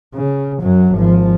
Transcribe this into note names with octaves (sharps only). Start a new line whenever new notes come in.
C#3
F#2 F#3
G#1 F3